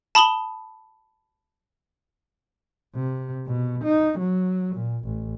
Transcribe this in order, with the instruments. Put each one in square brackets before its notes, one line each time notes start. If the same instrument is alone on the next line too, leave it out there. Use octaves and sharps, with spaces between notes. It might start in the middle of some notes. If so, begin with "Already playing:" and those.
[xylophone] A5 B5 D#6 F#7 G7
[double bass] C3
B2
D#4
F#3
A#2
A1